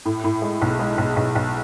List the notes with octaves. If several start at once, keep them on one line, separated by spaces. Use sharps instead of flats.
A2
A2
G#3
B1
G#3
B1
B1
B1